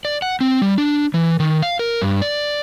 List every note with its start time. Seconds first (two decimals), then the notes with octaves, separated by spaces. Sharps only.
0.05 D5
0.22 F#5
0.41 C4
0.62 G3
0.78 D4
1.14 E3
1.40 D#3
1.62 F5
1.79 A#4
2.02 G2
2.22 D5